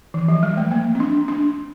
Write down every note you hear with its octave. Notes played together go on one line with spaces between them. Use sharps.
E3
F3
G3
A3
A#3
C4
D4
D4